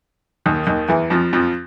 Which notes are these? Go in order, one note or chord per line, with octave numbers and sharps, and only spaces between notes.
D#2 D#3
D#2 D#3
E2 E3
F2 F3
F2 F3